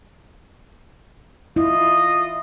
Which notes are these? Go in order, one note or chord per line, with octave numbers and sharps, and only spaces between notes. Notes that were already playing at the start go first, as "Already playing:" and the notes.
E4 F4 D#5